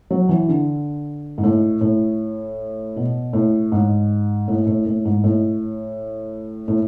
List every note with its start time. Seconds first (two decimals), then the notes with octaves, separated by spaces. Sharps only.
0.11 F#3
0.29 E3
0.49 D3
1.38 G#2
1.43 A2
1.81 A2
2.96 B2
3.33 A2
3.72 G#2
4.48 A2
4.67 A2
4.86 A2
5.05 G#2
5.24 A2
6.68 A2